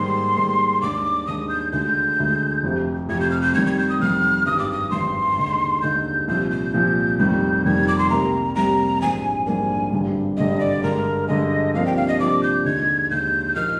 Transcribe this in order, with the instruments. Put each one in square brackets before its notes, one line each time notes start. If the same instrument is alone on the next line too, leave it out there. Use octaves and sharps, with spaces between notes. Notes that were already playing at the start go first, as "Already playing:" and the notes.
Already playing: [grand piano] G#2 D#3 G3 A#3 [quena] C6
[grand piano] G#2 D#3 G3 A#3
[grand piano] D#2 D#3 G#3 D4 [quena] D6
[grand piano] D#2 D#3 G#3 D4 [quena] D#6
[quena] G6
[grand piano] D2 D3 G#3 [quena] G6
[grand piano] D2 D3 G#3
F1 F2 C3
[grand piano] F1 F2 C3 [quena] G#6
[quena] G6
F6
G6
[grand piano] F2 D#3 G3 [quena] G#6
[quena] G#6
G6
D#6
[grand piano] F2 D#3 G3 [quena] F6
[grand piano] G#1 G2 D#3 G3 [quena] D#6
[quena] D6
D#6
[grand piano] G#1 G2 D#3 G3 [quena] C6
[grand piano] D#2 D3 G#3 D#4
[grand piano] D#2 D3 G#3 D#4 [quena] G6
[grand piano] C2 A#2 F3 [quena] G6
[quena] G6
[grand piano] C2 A#2 F3
[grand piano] F1 F2 D#3 G3 [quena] G6
[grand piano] F1 F2 D#3 G3 [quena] G#6
[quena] D6
C6
[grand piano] C2 C3 G3 A#3 [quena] A#5
[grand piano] C2 C3 G3 A#3 [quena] A#5
[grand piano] A#1 G#2 G3 A#3 D4 [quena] G#5
[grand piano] A#1 G#2 G3 A#3 D4 [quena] G#5
[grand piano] G#1 G2 D3 G3 D4
[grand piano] G#1 G2 D3 G3 D4 [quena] D#5
[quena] D5
[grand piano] G2 D3 G#3 [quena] A#4
[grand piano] G2 D3 G#3 [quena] D#5
[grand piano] C2 C3 F3 A#3 D4 [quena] F5
[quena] G5
F5
D#5
[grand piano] C2 C3 F3 A#3 D4 [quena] D6
[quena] G6
[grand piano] D#2 D3 G#3 D#4 [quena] G#6
[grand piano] D#2 D3 G#3 D#4 [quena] G6
[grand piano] A#2 F3 A#3 D#4 [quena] F6